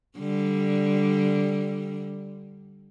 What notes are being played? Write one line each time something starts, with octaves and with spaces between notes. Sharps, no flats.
D3 G3